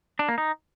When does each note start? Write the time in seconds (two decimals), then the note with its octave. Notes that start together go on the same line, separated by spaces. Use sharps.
0.19 D4
0.29 A#3
0.38 D#4